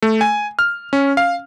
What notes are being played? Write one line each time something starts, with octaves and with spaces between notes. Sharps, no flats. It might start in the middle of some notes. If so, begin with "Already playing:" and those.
A3
G#5
F6
C#4
F5